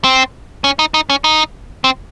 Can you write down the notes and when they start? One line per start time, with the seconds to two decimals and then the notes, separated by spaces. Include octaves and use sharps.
0.04 C4
0.64 C#4
0.79 D#4
0.94 D#4
1.10 C#4
1.24 D#4
1.84 C4